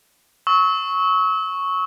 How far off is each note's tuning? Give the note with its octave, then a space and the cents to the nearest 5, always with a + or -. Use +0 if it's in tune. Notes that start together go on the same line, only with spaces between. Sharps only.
C#6 +0 E6 -40